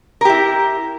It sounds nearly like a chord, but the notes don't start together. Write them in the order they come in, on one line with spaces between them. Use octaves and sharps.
A#4 G4 E4